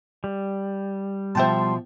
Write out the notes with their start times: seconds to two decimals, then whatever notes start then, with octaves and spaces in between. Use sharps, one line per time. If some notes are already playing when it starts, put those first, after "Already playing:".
0.24 G3
1.35 B2 F3 C5 E5 G5 A5 C6